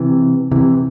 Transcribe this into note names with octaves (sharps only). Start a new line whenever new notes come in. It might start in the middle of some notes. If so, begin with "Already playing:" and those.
Already playing: C3 E3
C3 E3